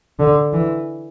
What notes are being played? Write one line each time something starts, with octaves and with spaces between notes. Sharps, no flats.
D3
E3